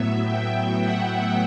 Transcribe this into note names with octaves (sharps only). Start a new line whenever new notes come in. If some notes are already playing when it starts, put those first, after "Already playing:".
Already playing: A2 F#3 B3 E5
G5
F#5